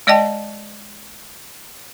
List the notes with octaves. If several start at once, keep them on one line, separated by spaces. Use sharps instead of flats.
G#3 D5 D#5 G5 A5